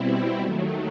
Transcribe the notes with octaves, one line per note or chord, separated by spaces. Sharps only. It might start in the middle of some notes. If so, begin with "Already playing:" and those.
Already playing: B2 G3 C4 E4
D#2 D#3 F#3 A3